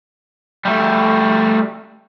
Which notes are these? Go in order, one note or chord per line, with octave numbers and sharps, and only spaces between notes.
G3 A3